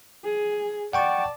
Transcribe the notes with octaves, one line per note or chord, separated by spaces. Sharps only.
G#4
D5 F#5 G5 A5 C#6